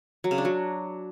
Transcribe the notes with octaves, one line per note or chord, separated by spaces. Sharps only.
F#3
C#3
D4
F#3